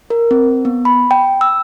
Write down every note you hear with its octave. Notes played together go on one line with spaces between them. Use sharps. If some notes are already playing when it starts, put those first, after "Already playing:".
A#4
C4
B3
B5
G5
E6